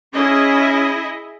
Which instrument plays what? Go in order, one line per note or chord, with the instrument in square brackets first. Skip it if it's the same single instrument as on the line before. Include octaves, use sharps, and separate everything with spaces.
[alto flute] C#4 [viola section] E4 G#4 D#5